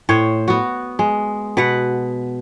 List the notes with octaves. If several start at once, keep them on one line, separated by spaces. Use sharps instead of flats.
A2 C5 C#5
B3 F#4
G#3
B2 B4 F#5